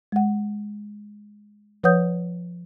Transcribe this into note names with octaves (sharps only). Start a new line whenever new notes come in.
G#3 F#5
F3 B4 C#5 F#5 D#6 G6